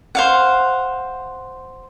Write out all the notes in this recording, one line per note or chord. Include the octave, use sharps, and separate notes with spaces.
C5 F5 F#5